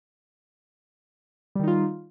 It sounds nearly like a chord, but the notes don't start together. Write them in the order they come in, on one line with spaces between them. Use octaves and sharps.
G3 D#3 D#4 F4